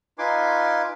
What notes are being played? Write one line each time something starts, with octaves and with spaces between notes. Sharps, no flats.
D#4 F4 B4 G#5 C6 D6